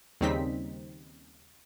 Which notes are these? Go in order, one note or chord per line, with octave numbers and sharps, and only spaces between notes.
D#2 C#3 G3 C4 D#4 B6